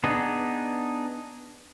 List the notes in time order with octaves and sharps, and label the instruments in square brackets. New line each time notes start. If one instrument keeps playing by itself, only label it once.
[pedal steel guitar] B3 D4 D#4 G#4